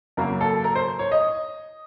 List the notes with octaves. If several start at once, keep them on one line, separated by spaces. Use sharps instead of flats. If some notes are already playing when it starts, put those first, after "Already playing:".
F#2 C#3 F#3 A#3 A#4
A4
A#4
C5
C#5
D#5